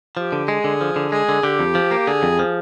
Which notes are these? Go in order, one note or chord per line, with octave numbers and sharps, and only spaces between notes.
F3 G4
D3
G#3 G#4
D3
F3
D3
G#3 G#4
D3
D3 G4
F2
F3
A#3
D3 G#4
F2
F3